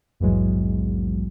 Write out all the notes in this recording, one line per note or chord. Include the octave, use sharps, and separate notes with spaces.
A#1 E2 G#2 E3 F#3 G#3